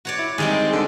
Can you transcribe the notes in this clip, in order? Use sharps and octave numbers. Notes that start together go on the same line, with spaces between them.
F#4 C#5 D5
E4
D#3 G3 G#3 C4
D3